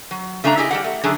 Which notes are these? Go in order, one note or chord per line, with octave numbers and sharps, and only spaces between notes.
F#3
C#3 A3 D4 A5 A#5
E4 G4 G#4 D#5
G3 G4 F#5
A3
D3 F#3 A3 D4 G#4